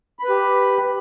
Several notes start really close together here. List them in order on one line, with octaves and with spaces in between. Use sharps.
B5 B4 G4